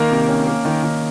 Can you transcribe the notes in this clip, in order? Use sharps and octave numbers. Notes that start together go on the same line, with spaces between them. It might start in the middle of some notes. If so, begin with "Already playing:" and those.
Already playing: D#3 A#3 A#4
C3
C#4
A#3
D#3
D#3